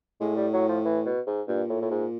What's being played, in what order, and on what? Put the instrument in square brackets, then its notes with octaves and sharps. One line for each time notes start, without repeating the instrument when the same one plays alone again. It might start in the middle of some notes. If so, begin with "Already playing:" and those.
[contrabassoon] A2 [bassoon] G#3
[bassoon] G3
F#3
F3
E3
B2
G#2
[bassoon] G2 [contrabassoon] A#2
[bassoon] A2
A2
G#2